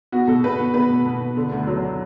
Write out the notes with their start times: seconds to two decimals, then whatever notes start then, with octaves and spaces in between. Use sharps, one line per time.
0.12 B3 F#4
0.27 B2 A4
0.44 B2 B4
0.59 B3
0.74 B3 B4
0.89 B2
1.06 B2
1.21 B3
1.37 D3
1.52 D2
1.67 F#3